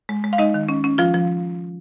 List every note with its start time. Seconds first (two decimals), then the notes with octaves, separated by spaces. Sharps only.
0.09 G#3
0.24 G#3
0.33 F5
0.39 G#3 D#4 D#5
0.54 D#3
0.69 C#4
0.84 C#4
0.98 F3 F4 F5
1.14 F3